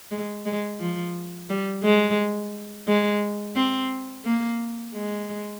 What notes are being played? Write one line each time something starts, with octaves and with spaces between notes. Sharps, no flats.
G#3
G#3
F3
G3
G#3
G#3
C4
A#3
G#3